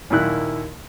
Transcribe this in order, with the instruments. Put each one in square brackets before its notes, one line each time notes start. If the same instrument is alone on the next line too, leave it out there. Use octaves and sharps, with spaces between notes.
[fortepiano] D#2 A#2 E4 F#6